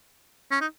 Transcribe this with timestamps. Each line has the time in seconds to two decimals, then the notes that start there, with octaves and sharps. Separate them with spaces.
0.51 C#4
0.61 D#4